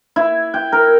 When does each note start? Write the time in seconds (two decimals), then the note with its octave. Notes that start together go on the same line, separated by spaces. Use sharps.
0.16 E4
0.54 G5
0.72 A#4